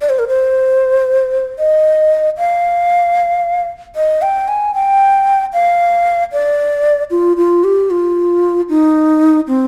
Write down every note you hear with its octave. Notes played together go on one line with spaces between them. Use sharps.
D5
C5
A#4
C5
D#5
F5
D#5
G5
G#5
G5
F5
D5
F4
F4
G4
F4
D#4
C4